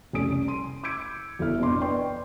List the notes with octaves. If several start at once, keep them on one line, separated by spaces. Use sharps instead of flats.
F1 C2 C#4 A4 D#6 D7
C6 D#7
D6 E6 G6 G#6 C#7 D7
G1 E4 F#4 A4 E5 F6
F2 B2 D4 C6 D6
B4 D5 G5 C6 C#6